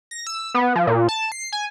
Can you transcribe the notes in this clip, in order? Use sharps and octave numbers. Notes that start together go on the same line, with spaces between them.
A#6
E6
B3
F3
A#2
A5
C7
G#5